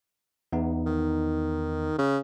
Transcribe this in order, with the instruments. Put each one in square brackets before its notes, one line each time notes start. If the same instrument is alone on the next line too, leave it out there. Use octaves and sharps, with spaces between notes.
[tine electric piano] E2 B3 D#4
[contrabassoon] D#3
C#3